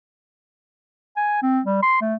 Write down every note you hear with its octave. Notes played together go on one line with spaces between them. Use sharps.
G#5
C4
G3
C6
A3